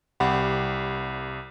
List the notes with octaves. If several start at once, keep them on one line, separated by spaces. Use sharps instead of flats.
C2 G4 F#5 B5